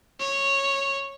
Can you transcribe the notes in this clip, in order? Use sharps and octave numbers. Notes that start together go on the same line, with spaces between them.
C#5